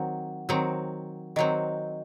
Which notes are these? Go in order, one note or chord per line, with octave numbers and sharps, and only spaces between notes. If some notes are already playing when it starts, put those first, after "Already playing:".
Already playing: D#3 F#3 C4 F#5
D#3 F#3 C4
D#3 F#3 C4 D#5